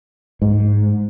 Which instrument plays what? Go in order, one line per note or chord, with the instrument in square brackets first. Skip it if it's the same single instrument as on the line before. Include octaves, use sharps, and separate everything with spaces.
[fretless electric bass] G#2